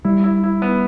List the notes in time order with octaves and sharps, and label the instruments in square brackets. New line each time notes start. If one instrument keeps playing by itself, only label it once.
[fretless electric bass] G3 [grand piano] E4
[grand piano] E4
E4
B3